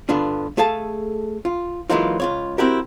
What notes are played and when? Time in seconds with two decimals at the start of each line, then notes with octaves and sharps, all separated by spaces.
0.09 G2 D3 B3 D4 F4
0.57 A3 G#4 A4 F5 A5
1.45 F4
1.90 E3 F#3 G#3 A#3 D#4 F4
2.20 C#2 F4 C#5
2.58 C4 E4 F#4 G4 A#4